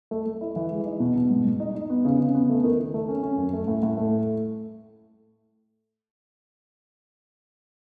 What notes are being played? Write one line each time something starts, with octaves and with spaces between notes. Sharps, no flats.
A3
A3
E4
E3
G#3
D#4
B2
B2
G#2
G#2
D#4
D#4
B3
C#3
C#3
B3
A3
D#3
D#3
A3
C#4
C#4
F#2
A3
A2
A2
A3